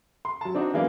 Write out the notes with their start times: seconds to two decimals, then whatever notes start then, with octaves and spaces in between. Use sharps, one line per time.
0.25 C6
0.41 F#3 A5
0.55 C4 D4 D#4 F#4
0.74 E3 F#3 G#3 A#3 B3 D4